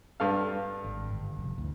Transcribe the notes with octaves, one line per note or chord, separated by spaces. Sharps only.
G2 A4 F5
G#1
G1
F1
D2 E3